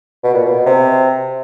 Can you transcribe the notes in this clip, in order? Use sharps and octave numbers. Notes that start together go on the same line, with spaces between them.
B2
A#2
B2
C3